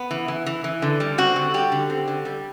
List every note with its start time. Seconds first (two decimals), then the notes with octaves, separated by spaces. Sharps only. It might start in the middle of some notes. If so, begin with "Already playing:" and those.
Already playing: B3
0.11 E3
0.28 E3
0.46 E3
0.64 E3
0.82 D3
1.00 G3
1.18 C4 F#4
1.36 D3
1.54 G3 G4
1.72 D3
1.90 C4
2.08 D3
2.25 G3